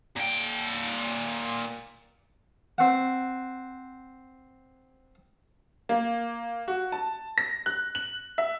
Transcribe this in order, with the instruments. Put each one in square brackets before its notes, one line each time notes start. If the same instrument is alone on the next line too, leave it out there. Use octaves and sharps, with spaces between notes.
[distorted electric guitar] A#2 G5
[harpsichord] C4 F#5
[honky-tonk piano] A#3
F#4
A5
A#6
F#6
F#7
E5